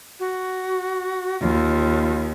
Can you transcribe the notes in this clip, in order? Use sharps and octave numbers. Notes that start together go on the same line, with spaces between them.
F#4
D#2 F4